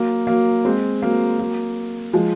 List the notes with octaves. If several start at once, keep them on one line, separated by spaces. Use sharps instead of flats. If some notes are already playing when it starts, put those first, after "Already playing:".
Already playing: F#3 A#3
F#3 A#3
G#3 C4
F#3 A#3
F#3 A#3
F3 G#3